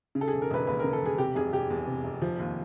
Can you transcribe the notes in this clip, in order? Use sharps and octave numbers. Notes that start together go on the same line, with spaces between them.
C#3
A4
G#4
E1
A#4
E1 B4
D#2 B4
A#4
C#3
A4
E1 G#4
C3 G4
F1 G#4
F1 G4
E2
C3
F1
F3
D#2